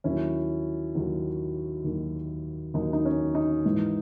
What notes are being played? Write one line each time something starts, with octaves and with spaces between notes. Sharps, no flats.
D#2 D#3 F#3 C#4 E4
D#2 D#3 F#3
D#2 D#3 F#3
D#2 D#3 F#3 D#4
D#4
C#4
D#4
G#2 E3